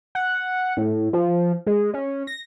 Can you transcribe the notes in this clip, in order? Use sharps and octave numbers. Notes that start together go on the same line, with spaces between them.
F#5
A2
F3
G#3
C#4
A#6